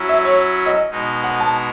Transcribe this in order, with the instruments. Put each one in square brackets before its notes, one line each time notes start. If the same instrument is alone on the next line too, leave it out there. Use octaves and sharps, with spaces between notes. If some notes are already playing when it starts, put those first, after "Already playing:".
Already playing: [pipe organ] F#3 C#4 E4
[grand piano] E5
C#5
D#5
[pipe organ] B2 G#3 D#4
[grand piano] F#5
A5